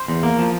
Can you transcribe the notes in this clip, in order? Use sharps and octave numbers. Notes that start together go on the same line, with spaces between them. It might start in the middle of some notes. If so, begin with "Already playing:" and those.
Already playing: C5
E2
A#3
F3